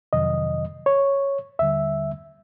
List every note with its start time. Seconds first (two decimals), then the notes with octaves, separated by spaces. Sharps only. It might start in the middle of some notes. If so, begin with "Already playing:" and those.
0.13 F2 C3 D#3 F#3 D#5
0.86 C#5
1.59 D#2 D3 G3 E5